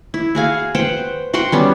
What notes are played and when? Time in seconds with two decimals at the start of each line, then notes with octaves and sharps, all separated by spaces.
0.14 E4
0.35 F#4 G#4 F5 G#5
0.75 B4 C5 F#5 G5
1.34 F#4 F#5 G5 C6
1.52 G3 B3 C#4